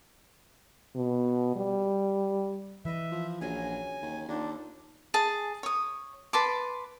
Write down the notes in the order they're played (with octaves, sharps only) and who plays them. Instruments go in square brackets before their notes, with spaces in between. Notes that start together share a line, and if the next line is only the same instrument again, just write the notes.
[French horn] B2
G3
[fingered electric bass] E3 [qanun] B4 D#5 [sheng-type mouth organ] E5
[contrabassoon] F3
[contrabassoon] A#1 [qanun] F#3 C#4 G#4 [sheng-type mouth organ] G#5
[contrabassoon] D#2
[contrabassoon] D#2 [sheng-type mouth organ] D4 [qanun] D#4 F4 A4
[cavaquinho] G#4 A5
C#5 D#6
B4 A5 C6 D6